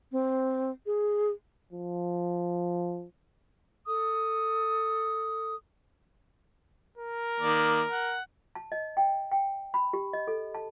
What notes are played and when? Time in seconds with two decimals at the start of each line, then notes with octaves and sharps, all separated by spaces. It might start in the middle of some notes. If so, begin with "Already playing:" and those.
0.12 C4
0.86 G#4
1.73 F3
3.86 A4 D#6
6.98 A#4
7.40 D#3 A#3 D5
7.92 F#5
8.55 A5
8.72 D#5
8.97 G5
9.32 G5
9.74 B5
9.93 G4
10.13 D#5
10.28 A4
10.55 A5